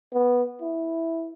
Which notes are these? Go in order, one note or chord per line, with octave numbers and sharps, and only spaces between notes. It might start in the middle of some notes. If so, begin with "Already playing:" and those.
B3
E4